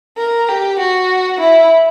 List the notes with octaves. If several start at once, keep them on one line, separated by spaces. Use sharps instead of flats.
A#4
G4
F#4
E4